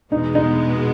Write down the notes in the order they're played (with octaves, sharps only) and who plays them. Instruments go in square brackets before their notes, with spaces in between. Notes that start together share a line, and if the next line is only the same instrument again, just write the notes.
[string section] E2 B2 G#3 B3 [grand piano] D#4
[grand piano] D#4